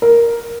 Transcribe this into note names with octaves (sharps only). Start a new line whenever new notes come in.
A#4